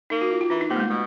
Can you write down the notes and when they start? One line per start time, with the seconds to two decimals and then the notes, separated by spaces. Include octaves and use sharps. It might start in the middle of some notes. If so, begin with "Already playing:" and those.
0.10 A#3 D#4
0.21 F#4
0.31 F4
0.41 F4
0.50 E3 D4
0.61 D#4
0.70 C3 A#3
0.76 G#3
0.80 A3
0.90 B2